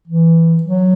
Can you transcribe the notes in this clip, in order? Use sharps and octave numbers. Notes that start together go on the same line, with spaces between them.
E3
F#3